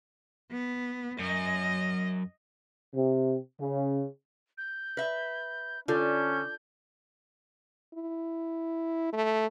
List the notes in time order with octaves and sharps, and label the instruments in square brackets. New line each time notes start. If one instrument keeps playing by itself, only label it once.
[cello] B3
[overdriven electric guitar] F#2 [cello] D#5
[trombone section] C3
C#3
[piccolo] G6
[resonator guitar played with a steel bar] B4 E5
[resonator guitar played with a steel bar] D3 [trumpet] C#4 [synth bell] F4 A4 [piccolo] G6
[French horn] E4
A3